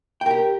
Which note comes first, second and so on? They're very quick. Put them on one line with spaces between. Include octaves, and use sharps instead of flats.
G5 A#4 G4